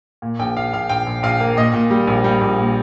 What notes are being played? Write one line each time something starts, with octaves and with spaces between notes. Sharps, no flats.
A#2
A#1 G5
A#1 F5
A#1 F5
A#1 G5
A#1
A#1 F5
A#3
A#2 D#5
A#2
G3
A#1
G3
A#1
A#2